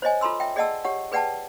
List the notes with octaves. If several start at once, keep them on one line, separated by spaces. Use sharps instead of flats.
C5 C#5 D#5 G#5
F4 A4 A#5 C6 E6
E5 G5
G#4 D5 D#5 F#5 A5 E6
G4 C#5 F#5
G#4 B4 D5 F#5 G5 A5